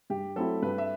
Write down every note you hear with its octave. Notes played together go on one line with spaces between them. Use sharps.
G2 G4
F#3 A3 C4 E4 A4
G2 B4
E5